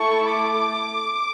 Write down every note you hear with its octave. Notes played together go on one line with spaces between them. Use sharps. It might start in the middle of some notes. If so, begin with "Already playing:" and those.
Already playing: A3 E4 A4 C#6
D6